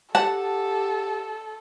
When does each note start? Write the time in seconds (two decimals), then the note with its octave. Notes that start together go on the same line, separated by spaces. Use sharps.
0.15 G4 A4 F#5 A5